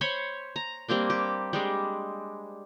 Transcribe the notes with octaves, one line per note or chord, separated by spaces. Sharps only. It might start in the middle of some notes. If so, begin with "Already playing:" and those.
C5 C#5 B5
A#5
G3 A#3 C4 D4
G4
G3 G#3 D4